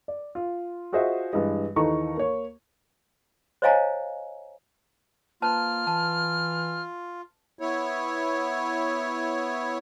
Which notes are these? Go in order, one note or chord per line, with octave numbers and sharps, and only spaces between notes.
D5
F4
F4 F#4 G#4 C5 D#5 E5
G2 E3 G#3
D#2 E3 D#4 A4 A#5 C#6
A#3 C#5
C5 C#5 D#5 F5 G#5 A#5
A#3 F4 B4 C5 A5 F6
E3 A5
B3 E4 C#5